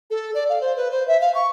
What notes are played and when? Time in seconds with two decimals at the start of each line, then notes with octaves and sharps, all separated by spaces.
0.11 A4
0.34 D5
0.49 F5
0.61 C5
0.77 B4
0.91 C5
1.08 E5
1.21 F5
1.35 C#6